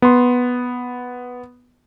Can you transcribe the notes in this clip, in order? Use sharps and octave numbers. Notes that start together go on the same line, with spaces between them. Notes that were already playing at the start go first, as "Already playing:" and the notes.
B3 C6